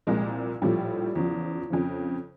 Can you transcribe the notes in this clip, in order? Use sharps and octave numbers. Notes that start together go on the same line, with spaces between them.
C2 A#2 F3 G#3
A#1 A2 F3 G3
E2 C#3 F3
F2 C#3 F3